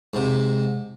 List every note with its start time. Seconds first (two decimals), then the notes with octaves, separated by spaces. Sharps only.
0.14 G#2 C3